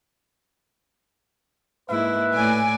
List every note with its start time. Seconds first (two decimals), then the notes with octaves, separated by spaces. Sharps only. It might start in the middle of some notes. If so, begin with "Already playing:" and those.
1.90 G#2 A#3 E4 B4 E5
2.35 A2 D5 G#5